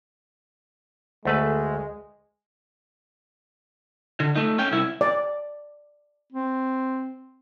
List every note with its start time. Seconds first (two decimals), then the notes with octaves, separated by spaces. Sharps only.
1.25 D2 G#3 A3 B4
4.20 D3
4.35 A3 D#4
4.59 C#4 G5
4.72 C2 E4
5.01 D5
6.33 C4